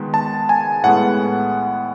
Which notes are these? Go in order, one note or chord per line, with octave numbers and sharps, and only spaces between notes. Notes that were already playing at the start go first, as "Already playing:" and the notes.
Already playing: D#3 G#3 B3
A5
G#5
A2 G#3 B3 F#5